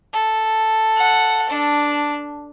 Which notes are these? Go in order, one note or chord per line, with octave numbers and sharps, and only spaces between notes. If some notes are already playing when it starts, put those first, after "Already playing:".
A4
F#5
D4